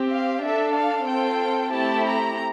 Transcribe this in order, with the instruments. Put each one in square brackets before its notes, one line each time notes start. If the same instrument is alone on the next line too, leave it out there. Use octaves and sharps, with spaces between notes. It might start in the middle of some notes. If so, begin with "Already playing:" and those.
Already playing: [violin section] C4 G4
F5
D4 A4 E5
F5
C4 F4 A4 G5
A3 C4 E4 G4 A5
A#5